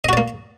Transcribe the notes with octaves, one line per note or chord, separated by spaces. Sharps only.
A#3 F#4 D5 D#5